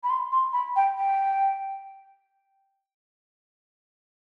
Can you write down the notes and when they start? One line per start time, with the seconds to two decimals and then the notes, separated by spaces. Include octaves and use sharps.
0.04 B5
0.10 C6
0.32 C6
0.53 B5
0.76 G5
0.98 G5